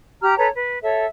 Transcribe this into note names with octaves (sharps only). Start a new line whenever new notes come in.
G4 A#5 F6
A4 B4 C#5 A#5
B4
A4 C#5 E5